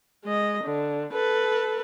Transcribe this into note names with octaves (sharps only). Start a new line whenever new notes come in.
G#3 D#5
D3
A4 B4